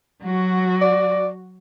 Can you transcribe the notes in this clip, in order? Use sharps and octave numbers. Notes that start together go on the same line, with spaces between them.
F#3 F#4
D5